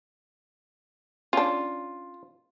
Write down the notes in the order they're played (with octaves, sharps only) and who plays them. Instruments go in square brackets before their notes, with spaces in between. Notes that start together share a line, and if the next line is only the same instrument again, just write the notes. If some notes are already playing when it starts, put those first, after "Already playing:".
[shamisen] C#4 D4 [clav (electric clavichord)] F4